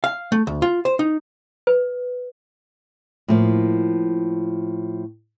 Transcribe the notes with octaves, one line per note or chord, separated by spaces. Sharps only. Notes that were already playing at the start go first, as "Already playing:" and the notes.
F5
A3
D2
F4
C5
D#4
B4
A2 F3 A#3